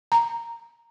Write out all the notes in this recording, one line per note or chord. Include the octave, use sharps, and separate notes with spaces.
A#5